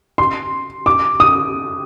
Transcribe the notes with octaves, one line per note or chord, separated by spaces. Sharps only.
C6
D6
D#6